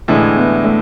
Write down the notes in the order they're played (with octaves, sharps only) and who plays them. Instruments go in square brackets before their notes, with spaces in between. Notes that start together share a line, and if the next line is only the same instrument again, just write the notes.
[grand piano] A2 E3 G#3 [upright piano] D3
[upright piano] B3
A3